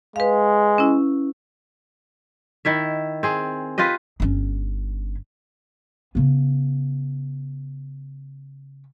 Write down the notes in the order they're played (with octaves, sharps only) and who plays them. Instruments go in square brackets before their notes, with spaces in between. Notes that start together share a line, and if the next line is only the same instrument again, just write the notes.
[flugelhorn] G#3 [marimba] B4 F5
[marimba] C#4 E4
[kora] D#3 E4 E5
C4 G#4
F4 G4 B4 D#5
[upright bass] G1 C#4
C#3 B3